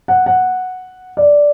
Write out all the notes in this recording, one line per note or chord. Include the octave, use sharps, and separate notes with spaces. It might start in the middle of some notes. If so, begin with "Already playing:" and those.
F#5
F#5
D5